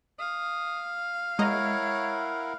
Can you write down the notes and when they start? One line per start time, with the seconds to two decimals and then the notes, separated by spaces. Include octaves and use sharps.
0.19 F5 D#6
1.39 G#3 E4 A#4 C#5 D#5 F#5 A#5